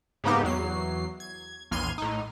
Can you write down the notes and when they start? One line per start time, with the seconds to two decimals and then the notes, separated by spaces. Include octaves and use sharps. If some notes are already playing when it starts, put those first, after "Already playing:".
0.24 G#2 C#3 A#3 B3 D#4 G4
0.43 E2 F#3 C7
1.20 G#6
1.71 A#1 E2 C6 F6 G#6 D#7
1.98 A2 D#4